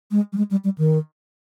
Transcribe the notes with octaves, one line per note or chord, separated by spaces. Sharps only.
G#3
G3
G#3
G3
G3
D#3